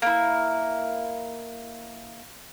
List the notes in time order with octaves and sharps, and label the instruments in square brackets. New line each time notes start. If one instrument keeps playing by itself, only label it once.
[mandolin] A#3 E4